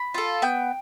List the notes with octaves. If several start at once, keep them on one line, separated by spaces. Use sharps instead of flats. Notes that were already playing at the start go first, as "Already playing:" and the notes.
Already playing: B5
F4 A4
B3 G5